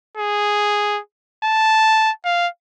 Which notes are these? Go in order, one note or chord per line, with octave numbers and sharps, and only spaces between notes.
G#4
A5
F5